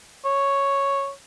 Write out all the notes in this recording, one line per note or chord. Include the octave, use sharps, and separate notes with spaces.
C#5